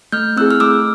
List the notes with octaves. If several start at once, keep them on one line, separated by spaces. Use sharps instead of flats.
A3 F6 G6
C4 E4 G#4 E6 F#6
F6
A3 D6 E6